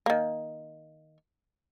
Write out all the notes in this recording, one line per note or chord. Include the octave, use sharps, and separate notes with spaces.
D#3 A#3